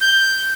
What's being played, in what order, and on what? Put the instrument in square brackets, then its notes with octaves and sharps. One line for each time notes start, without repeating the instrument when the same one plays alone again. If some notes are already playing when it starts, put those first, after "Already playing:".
[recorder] G6